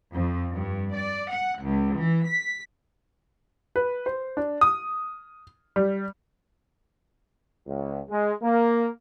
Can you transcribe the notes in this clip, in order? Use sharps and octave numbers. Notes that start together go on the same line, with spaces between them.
F2
G2
D5
F#5
C#2
E3
B6
B4
C5
D4
D#6
G3
C#2
G#3
A#3